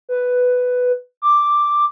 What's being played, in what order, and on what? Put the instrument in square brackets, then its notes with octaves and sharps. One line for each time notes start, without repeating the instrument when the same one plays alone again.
[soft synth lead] B4
D6